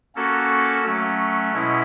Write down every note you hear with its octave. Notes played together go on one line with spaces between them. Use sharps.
A#3 C#4 F#4 A4
F#3 A3 C#4
B2 G#3 C#4 E4